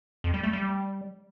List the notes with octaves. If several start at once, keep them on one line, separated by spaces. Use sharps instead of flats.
F2
G3
A3
G3